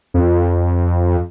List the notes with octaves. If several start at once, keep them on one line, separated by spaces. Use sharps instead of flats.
F2